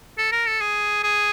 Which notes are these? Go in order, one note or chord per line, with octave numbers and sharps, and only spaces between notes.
A4
A#4
A4
G#4
G#4